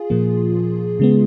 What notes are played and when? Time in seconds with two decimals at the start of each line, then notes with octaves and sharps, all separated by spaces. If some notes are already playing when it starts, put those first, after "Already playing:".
Already playing: F4 G#4
0.10 A#2 F3 A#3
1.00 C#3 G#3 B3